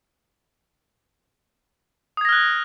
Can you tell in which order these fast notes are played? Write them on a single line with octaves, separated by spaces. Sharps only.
D#6 G#6 A#6 F6 F#6